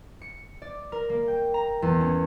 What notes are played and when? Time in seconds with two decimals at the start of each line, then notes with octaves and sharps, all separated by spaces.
0.22 C#7
0.62 D5
0.92 A#4
1.10 A#3
1.28 G5
1.54 A#5
1.82 E2
2.01 C#4